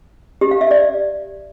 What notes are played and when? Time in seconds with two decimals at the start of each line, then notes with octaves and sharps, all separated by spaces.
0.41 G4
0.51 F5
0.61 E5
0.71 D5